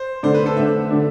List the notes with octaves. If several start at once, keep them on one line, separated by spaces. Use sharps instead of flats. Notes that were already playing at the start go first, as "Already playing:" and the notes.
Already playing: C5
D3 A3 D4 C5
B4
A4
D3 A3 D4 E5
D3 A3 D4